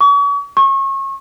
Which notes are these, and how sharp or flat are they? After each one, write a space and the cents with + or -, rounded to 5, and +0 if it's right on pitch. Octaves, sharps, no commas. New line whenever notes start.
C#6 +40
C#6 -30